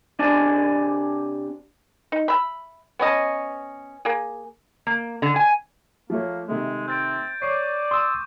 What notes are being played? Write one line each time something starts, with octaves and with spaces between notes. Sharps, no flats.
C3 D4 D5 G#5 A5
D#4
E5 B5
B3 C#4 D#5 A5
A#3 G#4
A#3
D3
G#5
F3 A3 A#3 C#5
C3 D#3 G#3 A3
C4 G6 A6 D7
C#5 D5 C#6 D6 C7
C6 D#6 E6